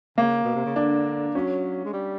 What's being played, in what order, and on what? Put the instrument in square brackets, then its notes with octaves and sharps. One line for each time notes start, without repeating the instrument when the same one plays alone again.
[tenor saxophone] C#3 [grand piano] A#3
[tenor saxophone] B2
C3
C#3
[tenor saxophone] D3 [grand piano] D4
[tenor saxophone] F#3 [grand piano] C#4
[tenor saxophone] G#3
G3